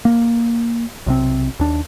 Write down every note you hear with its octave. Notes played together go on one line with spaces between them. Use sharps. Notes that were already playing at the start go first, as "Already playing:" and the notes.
A#3
B1 C3 C4
D#2 D4